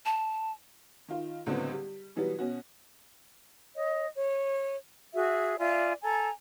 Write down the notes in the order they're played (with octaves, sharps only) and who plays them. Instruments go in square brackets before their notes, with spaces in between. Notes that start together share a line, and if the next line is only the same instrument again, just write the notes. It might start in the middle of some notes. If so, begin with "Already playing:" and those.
[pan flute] A5
[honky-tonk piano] D#3 F4
C#2 A2 D3 F#3 B3 C4
G3
B2 E3 F#3 G3 B3
B2 C#4 F#4
[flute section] C#5 D#5
C#5
F#4 G#4 E5
F4 D5 E5 G#5
A4 G#5 A#5